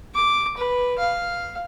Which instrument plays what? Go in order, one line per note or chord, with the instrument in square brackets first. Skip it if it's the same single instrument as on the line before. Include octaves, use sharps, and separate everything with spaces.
[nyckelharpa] D6
B4
F5